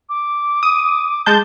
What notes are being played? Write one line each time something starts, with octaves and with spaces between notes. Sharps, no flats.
D6
D#6
G#3 A5 G6 G7